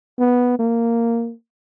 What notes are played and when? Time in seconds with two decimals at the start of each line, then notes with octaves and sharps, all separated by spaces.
0.19 B3
0.59 A#3